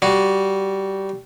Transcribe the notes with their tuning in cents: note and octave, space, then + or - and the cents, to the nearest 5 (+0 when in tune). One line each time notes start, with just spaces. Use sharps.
G3 -15 F#4 +0